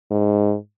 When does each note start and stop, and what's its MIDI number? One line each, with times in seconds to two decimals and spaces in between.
0.11 0.55 44